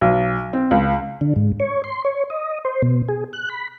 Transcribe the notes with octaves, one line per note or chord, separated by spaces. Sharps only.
B1
C4
C#2
D3
G#2
C#5
C6
C#5
D#5
C5
B2
G#4
F#6
B5